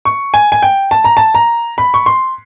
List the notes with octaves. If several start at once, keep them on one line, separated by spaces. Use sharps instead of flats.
C#6
G#5
G#5
G5
A5
A#5
A5
A#5
B5
C#6
C6